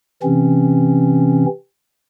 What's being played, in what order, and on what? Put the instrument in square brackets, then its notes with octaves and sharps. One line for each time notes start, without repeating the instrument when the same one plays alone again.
[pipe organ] C3 E3 C4 C#4